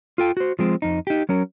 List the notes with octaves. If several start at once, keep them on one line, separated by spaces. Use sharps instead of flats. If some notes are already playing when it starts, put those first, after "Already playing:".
F4 A4 G5
F#4 C5
F3 G#3 C4
F2 D#4
D#4 G4
F#3 C#4 A#4